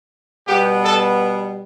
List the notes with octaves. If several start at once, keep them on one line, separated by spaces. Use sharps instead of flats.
B2 G3 B3 G4
A4